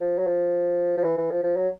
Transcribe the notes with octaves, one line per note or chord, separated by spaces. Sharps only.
F3
F#3
F3
F3
E3
E3
F3
F3
F#3